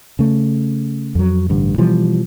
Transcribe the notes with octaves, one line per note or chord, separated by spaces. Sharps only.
C#3 A3
F2 F#3
A1 G2 D3
B2 E3 F3 G3